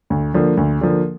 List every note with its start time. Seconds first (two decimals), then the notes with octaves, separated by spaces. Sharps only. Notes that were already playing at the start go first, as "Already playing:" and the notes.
0.10 D2
0.34 D3 F3 A#3
0.57 D2
0.81 D3 F3 A#3